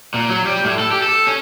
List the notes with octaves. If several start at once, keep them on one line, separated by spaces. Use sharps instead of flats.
A#2
F#3
G3
A2
A4
G4
A4
C#4